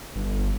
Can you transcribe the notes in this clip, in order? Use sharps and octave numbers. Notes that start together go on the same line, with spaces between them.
G1